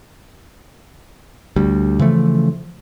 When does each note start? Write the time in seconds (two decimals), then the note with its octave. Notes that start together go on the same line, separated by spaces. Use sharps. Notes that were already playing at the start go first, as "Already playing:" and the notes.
1.56 D2 G3
1.99 C#3 E3 F3 A3